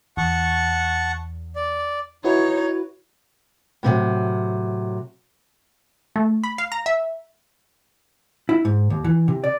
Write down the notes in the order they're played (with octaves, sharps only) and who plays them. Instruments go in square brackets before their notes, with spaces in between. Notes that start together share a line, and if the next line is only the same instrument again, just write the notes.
[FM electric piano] E2 [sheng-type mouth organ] F#5 A5 C#6
[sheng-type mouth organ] D5
[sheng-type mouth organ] D#4 [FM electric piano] E4 F#4 B4 [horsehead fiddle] C#5
[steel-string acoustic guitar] A2 C3 D#3 F#3
[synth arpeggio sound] A3
B5
F5
A#5
E5
[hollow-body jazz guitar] E4
G#2
D#2
E3
C3
D5